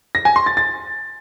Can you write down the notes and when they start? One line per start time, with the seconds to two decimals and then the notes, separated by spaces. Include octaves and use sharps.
0.15 A#6
0.25 G#5
0.36 C6
0.46 A6
0.57 A6